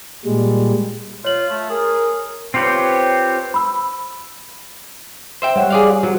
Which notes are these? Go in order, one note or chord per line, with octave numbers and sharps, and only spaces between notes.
A#2 G3 G#3
F4 C#5 F#7
A3
G#4 A#4
C4 F4 G4 B4 C#5
B5 E6
C5 E5 G5
G3 C#5 F#5
G#4 D5 F5
F#3 C5